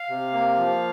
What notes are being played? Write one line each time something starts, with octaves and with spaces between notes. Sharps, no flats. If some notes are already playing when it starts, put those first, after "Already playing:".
Already playing: F5
C3
A#3
F3